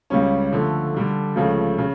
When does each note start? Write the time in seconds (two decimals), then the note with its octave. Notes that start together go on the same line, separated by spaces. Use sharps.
0.10 C#2 C#3 G3 C#4
0.53 D3 F3 A3
0.94 D3 G3 D4
1.36 C#2 C#3 F3 A3
1.78 C#3